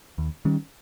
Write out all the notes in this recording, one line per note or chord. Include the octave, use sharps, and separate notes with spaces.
D#2
D#3 G3 C#4